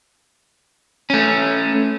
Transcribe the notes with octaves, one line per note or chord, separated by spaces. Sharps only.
A3 C#4